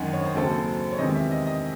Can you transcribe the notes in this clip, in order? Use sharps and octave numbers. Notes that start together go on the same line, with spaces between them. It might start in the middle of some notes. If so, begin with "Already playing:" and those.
Already playing: G#1 F#2 D#3 F#5
C#5
C5
D#2 C#3 F#3 C4 A4
C5
C#5
E2 C3 D#3 G#3 D#5
E5
D#5
D#5